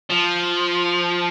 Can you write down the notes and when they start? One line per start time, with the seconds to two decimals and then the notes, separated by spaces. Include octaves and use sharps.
0.10 F3